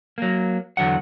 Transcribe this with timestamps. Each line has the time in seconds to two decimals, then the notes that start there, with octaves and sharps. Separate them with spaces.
0.18 F#3 A#3
0.77 E2 D3 F#3 F#5